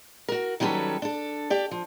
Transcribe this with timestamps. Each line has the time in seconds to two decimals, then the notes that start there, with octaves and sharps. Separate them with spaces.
0.28 F#4 A#4
0.60 D#3 F#3 G3 C#4 A4 B4
1.02 D4 A4
1.50 G4 D5
1.71 F3